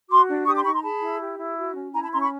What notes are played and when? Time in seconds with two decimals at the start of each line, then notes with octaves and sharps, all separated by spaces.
0.10 F#4 C6 D6
0.28 D4
0.47 G4 C#6 D#6
0.56 C6 D6
0.65 D#4 B5 C#6
0.74 A#5 C6
0.83 G#4 A5 B5
1.02 E4
1.20 G4
1.38 E4
1.57 F#4
1.75 C#4
1.94 E4 G#5 A#5
2.03 A5 B5
2.13 C#4 A#5 C6
2.21 B5 C#6